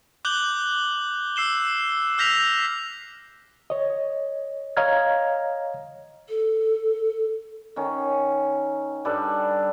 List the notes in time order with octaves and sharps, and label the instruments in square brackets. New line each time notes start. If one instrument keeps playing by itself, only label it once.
[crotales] D6 F#6 G6 F#7 G7
E6 C7 E7 G7
E6 F6 G6 A#6 B6 F7
[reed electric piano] C#5 D#5
C#5 D#5 F5 A#5 F6 G#6
[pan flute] A4
[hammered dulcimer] D#3 C#4
G2 G3 A4 B4